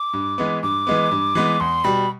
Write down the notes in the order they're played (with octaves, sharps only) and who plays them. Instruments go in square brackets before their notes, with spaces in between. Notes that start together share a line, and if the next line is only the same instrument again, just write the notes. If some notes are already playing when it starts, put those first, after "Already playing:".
Already playing: [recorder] D6
[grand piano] G2
E3 G#3 B3
[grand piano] G2 [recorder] D6
[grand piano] E3 G#3 B3
G2
E3 G#3 B3
[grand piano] E2 [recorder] C6
[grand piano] B2 G3 [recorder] B5